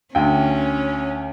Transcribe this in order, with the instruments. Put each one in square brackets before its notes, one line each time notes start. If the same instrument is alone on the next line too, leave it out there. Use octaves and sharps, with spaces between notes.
[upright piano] D2 G5 [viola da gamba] C#4